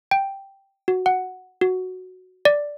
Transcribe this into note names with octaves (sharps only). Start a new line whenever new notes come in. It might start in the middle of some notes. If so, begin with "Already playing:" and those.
G5
F#4
F#5
F#4
D5